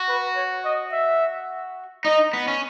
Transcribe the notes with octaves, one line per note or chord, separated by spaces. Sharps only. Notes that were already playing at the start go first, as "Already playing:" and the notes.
Already playing: F#4
B4
C#5
D#5
E5
D#4 D#5
B3
C#4